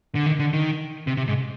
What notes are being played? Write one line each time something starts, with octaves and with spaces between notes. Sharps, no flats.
D3
D#3
D3
D#3
C3
C3
G#2